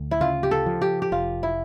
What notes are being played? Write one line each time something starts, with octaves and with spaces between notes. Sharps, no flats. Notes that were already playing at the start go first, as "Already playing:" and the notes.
Already playing: D2 D3
E4
C#3 F4
G4
A4
F3
G4
G4
F1 F4
E4